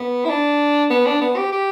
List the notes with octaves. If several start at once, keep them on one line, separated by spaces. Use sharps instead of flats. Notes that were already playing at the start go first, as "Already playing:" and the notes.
Already playing: B3
E4
D4
B3
D4
B3
G4
G4